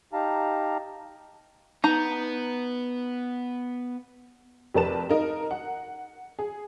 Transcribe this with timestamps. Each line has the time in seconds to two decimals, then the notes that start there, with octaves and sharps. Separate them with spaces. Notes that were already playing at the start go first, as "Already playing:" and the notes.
0.13 D#4 G4 F5 A5 A#5
1.84 B3 D#4 A#5
4.74 F1 G4 A#4 B4 A5 E7
5.09 D#4 A#4 D#5
5.51 F#5
6.39 G#4